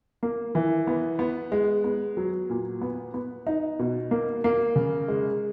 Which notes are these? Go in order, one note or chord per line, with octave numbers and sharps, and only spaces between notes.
A#3
E3
B3
B3
G#3
B3
F#3
A#2
B3
B3
D#4
B2
A#3
A#3
C#3
G#3